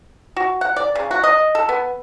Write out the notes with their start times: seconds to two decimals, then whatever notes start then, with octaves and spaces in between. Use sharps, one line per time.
0.36 F#4
0.61 F#5
0.76 D5
0.95 C#3
1.11 F#4
1.24 D#5
1.55 A4
1.69 B3